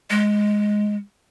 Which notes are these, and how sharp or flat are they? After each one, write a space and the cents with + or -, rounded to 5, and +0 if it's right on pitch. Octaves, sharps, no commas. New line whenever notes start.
G#3 +5